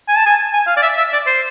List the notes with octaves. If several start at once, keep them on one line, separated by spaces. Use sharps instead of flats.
G#5
A5
G#5
G#5
F5
D5
E5
E5
D5
C5